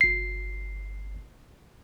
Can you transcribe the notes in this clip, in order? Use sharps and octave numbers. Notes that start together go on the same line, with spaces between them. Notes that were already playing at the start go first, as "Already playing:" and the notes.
G1 C7